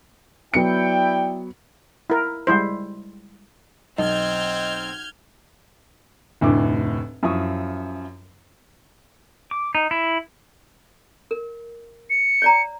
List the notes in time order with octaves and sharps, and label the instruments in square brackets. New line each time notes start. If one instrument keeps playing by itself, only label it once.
[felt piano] F#3 B3 C#7 [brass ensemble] E4 D5 G5
[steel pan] E4 A#4
G3 G#3 E4 C5
[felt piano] B1 [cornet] C4 [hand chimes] D#5 [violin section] F6 G6 G#6
[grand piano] F1 D2 A2 D3 E4 D6
F#2 F3 E4 C#6 D#6
[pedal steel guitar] D6
D#4
E4
[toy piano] A#4
[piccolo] C#7
[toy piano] C#5 D5 A#5